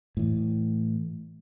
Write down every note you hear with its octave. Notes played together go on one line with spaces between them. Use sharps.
A2 E3